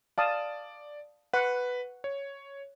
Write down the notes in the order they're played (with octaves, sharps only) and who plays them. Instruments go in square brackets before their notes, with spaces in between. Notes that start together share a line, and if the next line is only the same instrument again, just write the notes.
[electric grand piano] D5 [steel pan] F5 A5 D#6
[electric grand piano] B4 [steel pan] F#5
[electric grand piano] C#5